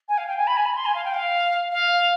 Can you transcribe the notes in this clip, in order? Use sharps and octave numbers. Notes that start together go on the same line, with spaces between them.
G#5
F5
G5
G#5
B5
G#5
B5
C6
G#5
F5
G5
F5
F5